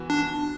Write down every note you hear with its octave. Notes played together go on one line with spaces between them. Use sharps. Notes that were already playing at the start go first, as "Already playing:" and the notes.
Already playing: E3 B3 F#4
D4